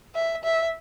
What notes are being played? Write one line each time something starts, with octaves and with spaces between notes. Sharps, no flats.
E5
E5